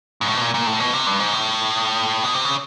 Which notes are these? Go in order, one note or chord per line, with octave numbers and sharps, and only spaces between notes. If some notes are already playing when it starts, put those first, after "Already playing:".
G#2
A2
B2
A#2
A#2
A2
B2
C3
G2
G#2
A2
B2
C3
C#3